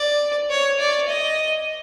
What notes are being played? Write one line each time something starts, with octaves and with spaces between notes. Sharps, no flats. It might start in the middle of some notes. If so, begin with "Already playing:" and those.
Already playing: D5
C#5
D5
D#5